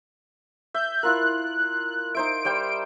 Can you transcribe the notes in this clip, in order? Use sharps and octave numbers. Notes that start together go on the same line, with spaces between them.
E5 G6
E4 F4 A#4 F#6
D#4 C5 E5 D7
G3 C5 G5